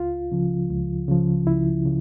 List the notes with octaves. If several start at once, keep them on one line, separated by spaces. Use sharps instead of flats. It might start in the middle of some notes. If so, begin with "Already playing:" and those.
Already playing: C#2 F4
C#3 F3
C#2
C#3 F3
C#2 E4
C#3